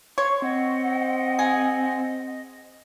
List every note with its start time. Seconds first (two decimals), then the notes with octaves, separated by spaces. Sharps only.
0.18 C#5 C6 C#6
0.42 C4 D#5 F#5
1.39 G#4